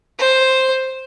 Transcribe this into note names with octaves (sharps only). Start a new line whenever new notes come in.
C5